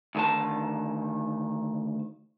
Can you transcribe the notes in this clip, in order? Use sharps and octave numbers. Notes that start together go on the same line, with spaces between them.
D2 D#3 A5